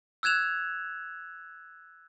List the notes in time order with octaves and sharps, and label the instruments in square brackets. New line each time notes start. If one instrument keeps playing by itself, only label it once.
[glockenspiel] E6 F#6 G#6 E7 F7